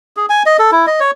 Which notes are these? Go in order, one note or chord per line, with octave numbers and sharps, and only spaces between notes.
G#4
G#5
D#5
A4
E4
D#5
C#5